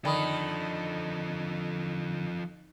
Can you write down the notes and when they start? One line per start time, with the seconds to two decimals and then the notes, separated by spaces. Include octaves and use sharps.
0.05 D3 D#3 F3 A4 D5 B5 D#6